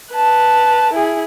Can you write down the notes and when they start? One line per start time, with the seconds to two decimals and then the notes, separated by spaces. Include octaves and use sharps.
0.12 B4 A5
0.93 E4 G#4